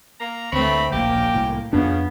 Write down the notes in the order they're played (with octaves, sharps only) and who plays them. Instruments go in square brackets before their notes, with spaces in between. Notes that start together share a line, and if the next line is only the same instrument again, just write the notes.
[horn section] A#3 A#5
[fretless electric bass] D2 [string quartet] A3 C4 [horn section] B4 C#5 B5
[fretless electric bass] D1 A#1 [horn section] F#2 G4 G5 [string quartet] A#3
[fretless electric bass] C2 A2
[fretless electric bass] F2 D4 [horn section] C#3 [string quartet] B3